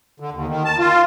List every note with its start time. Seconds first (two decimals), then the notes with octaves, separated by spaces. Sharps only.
0.20 D3
0.33 D#2
0.49 D#3
0.65 A5
0.79 F4